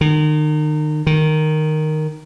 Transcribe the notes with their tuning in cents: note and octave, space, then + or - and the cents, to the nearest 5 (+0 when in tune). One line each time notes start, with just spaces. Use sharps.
D#3 -35
D#3 -5